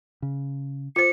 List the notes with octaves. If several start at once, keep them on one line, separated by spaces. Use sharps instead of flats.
C#3
F4 C5 C#7